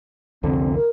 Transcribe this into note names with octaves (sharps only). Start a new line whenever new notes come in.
C2 F2 D3 C4
A#4